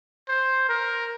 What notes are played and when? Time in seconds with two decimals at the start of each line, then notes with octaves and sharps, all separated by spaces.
0.29 C5
0.69 A#4